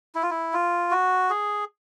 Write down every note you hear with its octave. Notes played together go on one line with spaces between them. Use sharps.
E4
F4
E4
F4
F#4
G#4